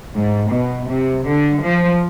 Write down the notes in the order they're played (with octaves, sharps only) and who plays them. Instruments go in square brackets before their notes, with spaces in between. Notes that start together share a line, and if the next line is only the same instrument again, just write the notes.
[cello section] G#2
B2
C3
D3
F3